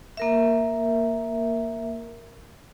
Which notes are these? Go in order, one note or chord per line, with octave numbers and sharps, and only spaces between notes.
A#3 A#4 E5